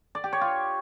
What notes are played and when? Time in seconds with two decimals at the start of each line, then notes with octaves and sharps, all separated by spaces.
0.15 D5
0.24 G4
0.33 C#5
0.41 F4